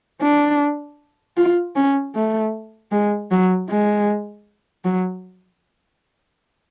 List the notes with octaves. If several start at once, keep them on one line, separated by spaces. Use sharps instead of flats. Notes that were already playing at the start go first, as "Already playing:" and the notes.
D4
F4
C#4
A3
G#3
F#3
G#3
F#3